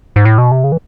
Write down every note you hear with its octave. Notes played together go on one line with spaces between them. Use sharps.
G#2
A2
B2
C3
C#3
E3